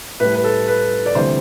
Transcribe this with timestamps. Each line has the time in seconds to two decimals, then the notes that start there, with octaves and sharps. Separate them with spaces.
0.20 A2 G3 B4
0.35 B4
0.44 A4
0.68 B4
1.06 D5
1.15 D2 C3 E3 G3 C5